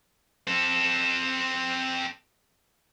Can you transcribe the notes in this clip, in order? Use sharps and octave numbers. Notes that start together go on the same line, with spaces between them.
C4 A4